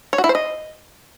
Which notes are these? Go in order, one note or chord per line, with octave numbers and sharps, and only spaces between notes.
C#5
F#4
E4
C5
D#5